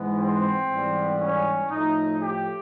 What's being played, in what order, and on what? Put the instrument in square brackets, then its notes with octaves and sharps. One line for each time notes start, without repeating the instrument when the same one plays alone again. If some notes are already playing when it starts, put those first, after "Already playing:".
Already playing: [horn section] G#2 E3 G#3 B3
C4
G#2 E3 G3 B3
C#4
A2 F3 A3 D#4
G4